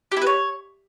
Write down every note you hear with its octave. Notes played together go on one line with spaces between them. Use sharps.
G4
E4
B4
C#5